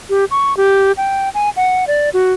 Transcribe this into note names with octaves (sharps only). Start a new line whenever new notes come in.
G4
C#6
G4
G5
G#5
F#5
D5
F#4